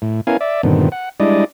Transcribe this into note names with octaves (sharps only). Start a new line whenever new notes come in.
A2
B3 C#4 E4 A#4 F5 G#5
D5 E5
G2 A#2 D3 D#3 B3 C4
F#5
G3 G#3 D4 E4 D5 D#5